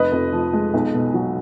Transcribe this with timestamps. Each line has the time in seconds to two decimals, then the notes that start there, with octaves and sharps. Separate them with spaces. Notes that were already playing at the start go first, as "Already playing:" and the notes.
Already playing: F1 B4 D#5
0.12 F2
0.33 F3
0.53 G#3
0.74 B1
0.94 B2
1.14 F#3